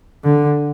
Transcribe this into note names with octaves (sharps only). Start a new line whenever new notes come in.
D3